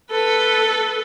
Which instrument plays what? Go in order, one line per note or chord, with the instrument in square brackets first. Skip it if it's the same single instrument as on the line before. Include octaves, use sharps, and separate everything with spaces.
[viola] A4 B4